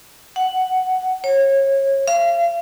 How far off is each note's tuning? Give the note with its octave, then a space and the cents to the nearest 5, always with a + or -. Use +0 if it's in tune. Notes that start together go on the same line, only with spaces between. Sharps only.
F#5 +5
C#5 -25
F5 -35